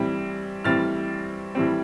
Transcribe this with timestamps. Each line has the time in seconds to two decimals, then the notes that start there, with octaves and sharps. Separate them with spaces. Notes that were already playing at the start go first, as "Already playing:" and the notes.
Already playing: A2 E3 G3 C4
0.64 A2 E3 G3 C4 F6 A6
1.55 A2 E3 G3 C4